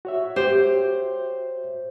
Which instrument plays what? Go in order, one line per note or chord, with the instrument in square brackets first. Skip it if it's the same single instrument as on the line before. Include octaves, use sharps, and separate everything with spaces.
[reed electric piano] F#4 C#5 E5
[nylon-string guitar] G4 [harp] C5